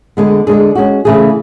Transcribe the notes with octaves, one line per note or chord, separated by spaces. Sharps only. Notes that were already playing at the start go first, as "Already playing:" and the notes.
D3 G#3 B3
D3 G#3 D4 G#4
G#3 C#4 F#4
C#3 E3 A3 E4 G#4